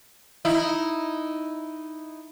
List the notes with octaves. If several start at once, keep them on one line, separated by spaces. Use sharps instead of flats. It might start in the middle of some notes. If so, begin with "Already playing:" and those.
D#4 E4